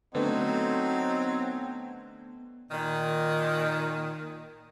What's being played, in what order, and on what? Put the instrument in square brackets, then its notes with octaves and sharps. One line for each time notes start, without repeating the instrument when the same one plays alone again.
[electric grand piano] D3 A3 [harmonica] F#3 D#4 [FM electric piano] B3 [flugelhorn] C4
[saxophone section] A#2 D#3